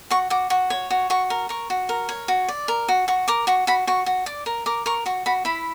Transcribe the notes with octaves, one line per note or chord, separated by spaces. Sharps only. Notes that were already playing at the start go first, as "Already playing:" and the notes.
F#4 C#6
F#4 D6
F#4 C#6
C#5
F#4
F#4 C#6
A#4
A#4 C#6
F#4
A#4
C#5
F#4
D5
A#4
F#4
F#4 C#6
A#4 D6
F#4 C#6
F#4 B5
F#4 C#6
F#4
D5 D6
A#4
A#4 D6
A#4 C#6
F#4 C#6
F#4 B5
E4 B5